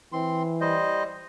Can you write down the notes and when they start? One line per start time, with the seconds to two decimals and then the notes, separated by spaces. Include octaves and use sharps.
0.13 E3 C4 C6
0.61 G3 C5 D#5